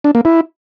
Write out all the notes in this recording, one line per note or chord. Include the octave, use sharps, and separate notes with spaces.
D4
A#3
E4